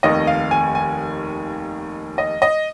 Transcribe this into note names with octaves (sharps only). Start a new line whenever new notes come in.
F1 D#2 D#3 D#5
F5
G#5
G#5
D#5
D#5